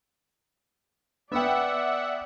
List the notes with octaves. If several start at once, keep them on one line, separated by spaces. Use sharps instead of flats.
B3 B4 D5 E5 F#5 G5